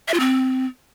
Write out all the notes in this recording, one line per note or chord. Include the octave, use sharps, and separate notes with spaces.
E5
F4
C4